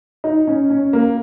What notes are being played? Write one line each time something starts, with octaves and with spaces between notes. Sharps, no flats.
D#4
C#4
C#4
A#3